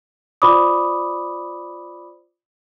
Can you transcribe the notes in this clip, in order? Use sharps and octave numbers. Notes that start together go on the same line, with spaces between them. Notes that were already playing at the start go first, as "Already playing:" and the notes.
F4 C5 D5 B5 D6 D#6